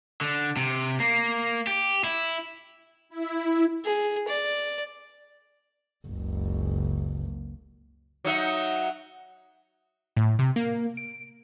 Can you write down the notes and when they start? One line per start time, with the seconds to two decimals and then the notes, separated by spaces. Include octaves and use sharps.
0.21 D3
0.57 C3
1.00 A#3
1.67 G4
2.04 E4
3.09 E4
3.85 G#4
4.28 D5
6.07 F#1 C#2
8.25 F#3 D#4 E5
10.17 A2
10.39 C3
10.56 A#3
10.97 D7